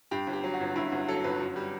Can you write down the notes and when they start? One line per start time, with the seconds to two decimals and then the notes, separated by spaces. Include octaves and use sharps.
0.11 G2 G4
0.27 G1
0.33 G4
0.43 F#3
0.54 F#4
0.60 G1
0.76 G2 E4
0.91 G1 F#4
1.08 F#3 A4
1.24 G1 B4
1.40 F#2
1.56 G3